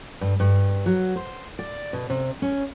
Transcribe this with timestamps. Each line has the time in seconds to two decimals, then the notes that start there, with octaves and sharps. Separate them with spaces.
0.21 G2
0.40 G2
0.86 F#3
1.16 C5
1.59 D5
1.93 B2
2.10 C3
2.42 C#4